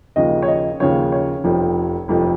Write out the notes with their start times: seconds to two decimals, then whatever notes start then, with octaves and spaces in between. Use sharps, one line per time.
0.16 D#2 C#3 F3 D#5
0.42 C#5
0.48 D#5
0.80 D#2 C#3 F3 C#5
1.12 C#5
1.44 F1 F2 F3
2.08 F1 F2 F3